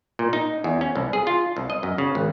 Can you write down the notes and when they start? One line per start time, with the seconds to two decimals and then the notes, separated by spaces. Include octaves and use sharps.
0.19 A#2
0.33 D#4
0.64 E2
0.81 C#4
0.95 C2
1.13 G#4
1.27 F4
1.57 C2
1.70 D#5
1.83 F#2
1.98 C#3
2.15 G#1